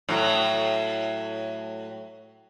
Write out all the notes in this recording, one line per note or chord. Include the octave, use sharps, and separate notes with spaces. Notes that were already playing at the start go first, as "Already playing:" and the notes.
A2 F#3